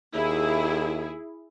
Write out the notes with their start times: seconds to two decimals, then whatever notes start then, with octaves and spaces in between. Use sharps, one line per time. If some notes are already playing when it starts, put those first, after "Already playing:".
0.15 D#2 E4 G#4